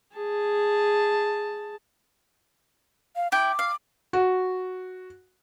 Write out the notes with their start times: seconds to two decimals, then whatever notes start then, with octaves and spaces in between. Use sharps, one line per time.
0.16 G#4 A5
3.16 F5
3.32 E4 G5 D6
3.59 F5
4.13 F#4